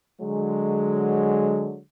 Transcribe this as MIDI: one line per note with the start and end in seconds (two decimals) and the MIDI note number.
0.22 1.79 50
0.22 1.79 54
0.22 1.79 56